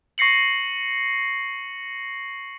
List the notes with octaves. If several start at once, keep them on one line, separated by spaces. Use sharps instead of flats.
C#6 A#6 C7 C#7 F#7